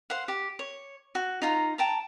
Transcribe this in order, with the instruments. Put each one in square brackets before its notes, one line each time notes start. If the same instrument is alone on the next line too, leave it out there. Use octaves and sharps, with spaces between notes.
[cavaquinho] C5 F5 F#5
G4
C#5
F#4
D#4 F4 A#5
G5 A5 A#5